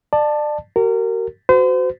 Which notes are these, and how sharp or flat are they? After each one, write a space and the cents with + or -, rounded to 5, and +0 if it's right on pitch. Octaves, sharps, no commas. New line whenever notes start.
D5 +30 A5 +5
F#4 +40 A#4 -25
F#4 +0 C5 -40